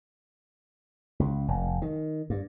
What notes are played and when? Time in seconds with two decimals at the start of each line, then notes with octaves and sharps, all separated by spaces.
1.20 C#2
1.48 F1
1.82 D#3
2.30 G2